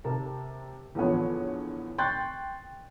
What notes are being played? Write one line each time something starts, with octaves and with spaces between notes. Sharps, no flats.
C3 A#4 A5
E2 A2 D3 F3 B3 C#5
G5 C6 C#6 F#6 G6 A6